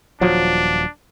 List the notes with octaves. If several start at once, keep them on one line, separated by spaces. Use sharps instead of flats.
D#1 F3 F#3 D4